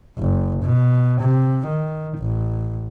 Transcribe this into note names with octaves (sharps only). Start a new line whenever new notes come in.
F#1
B2
C3
D#3
A1